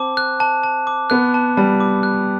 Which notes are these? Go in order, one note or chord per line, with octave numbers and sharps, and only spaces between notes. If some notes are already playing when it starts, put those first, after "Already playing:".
Already playing: C4 A5 D6
F#6
A5
A5
D6
B3 F#6
A5
G3 A5
D6
F#6